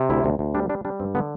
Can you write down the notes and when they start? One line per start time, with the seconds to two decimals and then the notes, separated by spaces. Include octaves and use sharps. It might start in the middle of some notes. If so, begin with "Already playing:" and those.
Already playing: C3
0.10 D2 E4
0.24 D2
0.39 D2
0.55 G3 D4
0.69 G3 D4
0.85 G3 D4
1.00 G2 C4
1.15 D3 B3